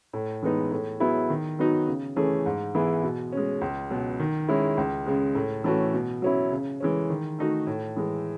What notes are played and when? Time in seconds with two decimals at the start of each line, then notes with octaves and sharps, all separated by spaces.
0.13 A2
0.42 E3 G#3 B3 D#4
0.71 A2
1.00 F#3 B3 E4 G#4
1.30 D#3
1.59 F#3 B3 D#4 F#4
1.87 C#3
2.16 E3 A3 C#4 G#4
2.46 G#2
2.75 E3 B3 E4 G#4
3.03 B2
3.33 G#3 C#4
3.61 C#2
3.90 B2 F#3
4.20 D#3
4.49 G#3 C#4 E4
4.77 C#2
5.06 C#3 G#3
5.35 A2
5.64 E3 A3 C#4 F#4
5.94 B2
6.22 F#3 C#4 E4
6.52 C#3
6.80 E3 G#3 C#4
7.09 D#3
7.39 A3 D#4 F#4
7.67 A2
7.96 E3 G#3